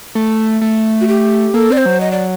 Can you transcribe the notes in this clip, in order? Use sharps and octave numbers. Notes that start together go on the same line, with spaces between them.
A3
A3
F#4
G4
A#3 A4
C4 D5
C5
F#3
D#5
D5